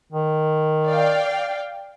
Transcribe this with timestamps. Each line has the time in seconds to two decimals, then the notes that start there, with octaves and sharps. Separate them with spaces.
0.12 D#3
0.88 D5 F5 G5